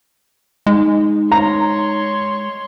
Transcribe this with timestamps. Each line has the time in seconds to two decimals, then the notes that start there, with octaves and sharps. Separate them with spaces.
0.67 G#3 D#4
1.32 C#5 A#5 C6